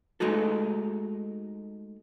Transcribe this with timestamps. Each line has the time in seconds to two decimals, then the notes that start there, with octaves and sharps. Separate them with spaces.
0.20 G#3 A3 D#4 F#4 A4